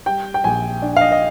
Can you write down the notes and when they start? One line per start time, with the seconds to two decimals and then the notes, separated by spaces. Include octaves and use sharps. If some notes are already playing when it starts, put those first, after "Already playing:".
0.06 G3 G5
0.34 G5
0.44 A#1 G#5
0.82 D4
0.96 F5
1.01 D#5
1.12 D#5